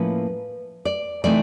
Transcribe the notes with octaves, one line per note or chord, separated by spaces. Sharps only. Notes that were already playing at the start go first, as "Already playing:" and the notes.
Already playing: A2 F3 A#3 C#4 E4 B4
D5
C3 E3 A3 C4 D#4 D5